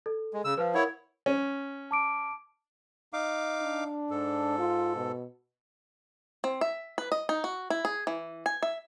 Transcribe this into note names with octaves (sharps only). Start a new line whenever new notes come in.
A4
G#3
C#3 E6
F3 B4 C5 F5
E4 A#4 C#5 F#5
C#4
A5 D6 D7
D#4 F5 D6
D4
G#2 A4
F4
B2
C4
E5
B4
D#5
D#4
F#4
E4
G#4
E3
G#5
E5